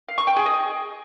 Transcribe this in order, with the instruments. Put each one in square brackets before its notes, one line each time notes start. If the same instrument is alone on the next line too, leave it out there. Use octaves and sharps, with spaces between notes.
[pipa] F5
C#6
G5
G#4
D#5